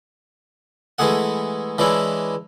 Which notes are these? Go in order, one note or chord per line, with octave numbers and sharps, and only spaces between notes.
E3 G#3 A3 G#4 F#5
E3 G#3 C#4 D4 E4